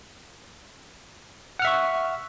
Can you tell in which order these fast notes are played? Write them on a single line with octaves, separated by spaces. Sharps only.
F#5 F6 E5 C#6